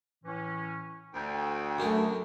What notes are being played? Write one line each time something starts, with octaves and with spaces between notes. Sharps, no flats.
A2 E3 C#4
D2 G5
F#2 A3 C#4 A#4